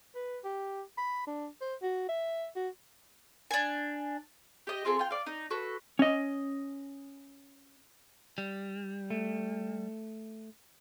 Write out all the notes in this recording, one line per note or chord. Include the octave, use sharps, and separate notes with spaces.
B4
G4
B5
D4
C5
F#4
E5
F#4
D4 G#5
G4 D#5
C4 F4 G#4 A4
F4 G5
D5 F5
D#4
F#4 A4 B4
C#4 D#5
G3
A3